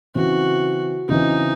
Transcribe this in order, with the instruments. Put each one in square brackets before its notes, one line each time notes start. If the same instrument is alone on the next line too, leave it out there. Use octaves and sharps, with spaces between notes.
[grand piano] C#3 E3 C4 [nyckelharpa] F#4
[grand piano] C#3 E3 C4 [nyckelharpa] D#4